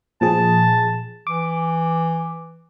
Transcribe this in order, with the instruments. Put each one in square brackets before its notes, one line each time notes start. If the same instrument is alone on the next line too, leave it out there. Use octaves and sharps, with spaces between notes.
[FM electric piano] A#2 F3 G#4 [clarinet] A5
[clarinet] E3 [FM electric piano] D6